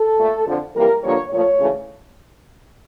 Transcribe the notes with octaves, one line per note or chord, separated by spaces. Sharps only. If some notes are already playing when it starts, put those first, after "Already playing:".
Already playing: A4
A#2 A3
F2 D3 F3
F2 E3 G3 A#3 A#4
G2 D3 F3 A#3 C#5
A#2 F3 A3 C#5
D2 C#3 E3 A3